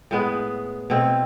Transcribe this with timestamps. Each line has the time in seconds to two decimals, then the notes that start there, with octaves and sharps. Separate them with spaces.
0.11 A2 G#3 B3
0.90 B2 A3 C4